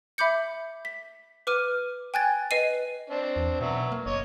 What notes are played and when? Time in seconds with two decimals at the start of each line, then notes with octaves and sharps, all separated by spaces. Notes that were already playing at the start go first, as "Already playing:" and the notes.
0.18 E5 B5 D6 G6 C#7
0.85 B6
1.47 B4 D6 F6 D#7
2.14 G5 G#5 F#6 G#6 A6
2.51 B4 D#5 C7 D#7
3.10 C4 D4
3.36 E2
3.61 B2 F#3 B3 E5
3.92 A#3
4.06 F#1 C#5 D#5